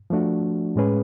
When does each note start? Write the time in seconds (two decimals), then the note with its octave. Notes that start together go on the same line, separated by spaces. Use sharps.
0.10 F3 A3 D4 F#4
0.76 A2 G#3 C#4 G#4 B4